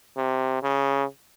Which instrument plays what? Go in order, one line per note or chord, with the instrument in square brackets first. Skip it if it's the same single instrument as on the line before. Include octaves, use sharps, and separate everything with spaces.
[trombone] C3
C#3